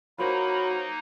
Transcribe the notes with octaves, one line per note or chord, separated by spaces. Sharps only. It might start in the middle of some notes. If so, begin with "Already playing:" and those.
F#3 A#3 D#4 F4 A#4 C5 B5